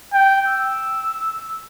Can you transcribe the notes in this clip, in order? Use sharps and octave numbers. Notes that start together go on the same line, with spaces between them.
G5
E6